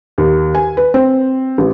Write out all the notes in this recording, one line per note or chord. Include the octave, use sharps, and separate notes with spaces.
D#2
G#5
B4
C4
A1